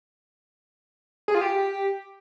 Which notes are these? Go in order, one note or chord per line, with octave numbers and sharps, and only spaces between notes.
G#4
F4
G4